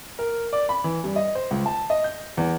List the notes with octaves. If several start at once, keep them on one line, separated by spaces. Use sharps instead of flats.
A#4
D5
B5
E3
G2
D#5
C5
C#2
A5
D#5
G6
E2